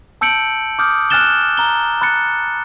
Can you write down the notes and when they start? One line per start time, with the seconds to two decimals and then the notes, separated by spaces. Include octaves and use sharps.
0.21 A5 E6 G6 C#7 D7 F#7
0.79 D6 D#6 F6 G6
1.10 G#5 F6 F#6 A6 E7 G7
1.57 A#5 G7
2.02 B5 F#6 A6 C#7